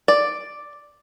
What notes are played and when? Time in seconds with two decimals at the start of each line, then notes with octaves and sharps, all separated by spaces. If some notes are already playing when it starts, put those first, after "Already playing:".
0.08 D5